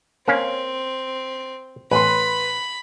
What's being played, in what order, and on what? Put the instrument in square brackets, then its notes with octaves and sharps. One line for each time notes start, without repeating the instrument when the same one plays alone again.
[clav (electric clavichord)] A#3 C#4 F5 [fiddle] C4
[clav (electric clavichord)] A1 [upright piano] B4 C6 [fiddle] B5